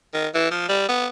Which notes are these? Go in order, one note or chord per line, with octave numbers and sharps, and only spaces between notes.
D#3
E3
F3
G3
B3